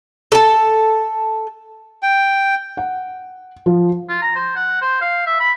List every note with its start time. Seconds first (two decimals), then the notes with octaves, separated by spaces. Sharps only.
0.32 A4 A5
2.03 G5
2.77 F#5
3.66 F3
4.09 F4
4.22 A#5
4.36 C5
4.56 F#5
4.82 C5
5.01 F5
5.26 E5
5.40 B5